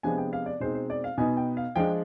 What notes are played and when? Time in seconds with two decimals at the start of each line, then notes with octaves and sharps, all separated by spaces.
0.03 C3 F3 G#3 B3 D4 G#5
0.18 G5
0.33 F5
0.46 D5
0.60 B2 G#3 C4 D#4 C5
0.75 C5
0.90 D5
1.04 F5
1.18 B2 B3 D#4 G#5
1.37 G5
1.57 F5
1.76 F3 G#3 D4 G5